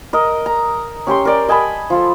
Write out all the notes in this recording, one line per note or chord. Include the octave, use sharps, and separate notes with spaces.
A#4 D#5
A#5
C#4 G4 C#5 C6
A#4 D5
D#5 G#5 A5 B5
F3 F4 A4